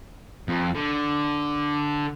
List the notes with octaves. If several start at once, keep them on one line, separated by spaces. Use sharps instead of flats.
F2
D3